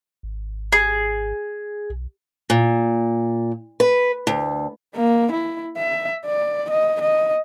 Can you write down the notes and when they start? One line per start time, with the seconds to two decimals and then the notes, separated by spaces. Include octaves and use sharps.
0.23 G#1
0.72 G#4
1.90 B1
2.50 A#2
3.80 B4
4.27 D2
4.96 A#3
5.32 E4
5.77 E5
6.26 D5
6.70 D#5
7.01 D#5